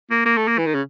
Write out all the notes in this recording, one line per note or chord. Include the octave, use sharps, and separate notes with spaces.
A#3
A#3
A3
A#3
E3
D#3
C#3